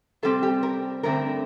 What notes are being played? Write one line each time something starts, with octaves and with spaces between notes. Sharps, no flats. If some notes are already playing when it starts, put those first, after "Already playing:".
C3 G3 C4 A4
G4
A#4
G2 D3 A3 C4 A#4